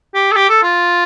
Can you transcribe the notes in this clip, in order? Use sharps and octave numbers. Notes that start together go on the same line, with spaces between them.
G4
A4
G4
A4
F4